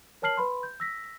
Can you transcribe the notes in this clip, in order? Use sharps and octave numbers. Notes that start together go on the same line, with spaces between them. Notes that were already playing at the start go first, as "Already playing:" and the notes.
A#4 C#5 A5 F6 C7 F#7
B4 B5 C6
G6
E6 A#6 B6